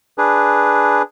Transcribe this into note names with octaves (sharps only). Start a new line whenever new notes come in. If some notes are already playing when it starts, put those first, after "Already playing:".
D4 G#4 B4